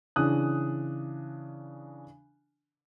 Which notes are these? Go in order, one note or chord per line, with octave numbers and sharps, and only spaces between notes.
C#3 E3 D4 D#6 F#6